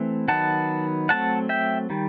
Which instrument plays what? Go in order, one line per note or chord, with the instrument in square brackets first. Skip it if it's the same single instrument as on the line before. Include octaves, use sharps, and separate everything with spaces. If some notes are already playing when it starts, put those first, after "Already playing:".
Already playing: [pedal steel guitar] E3 A3 C4
D#3 F#3 B3 F#5 A5
F#3 A3 C4 F#5 A5
E5 G5
D#3 G3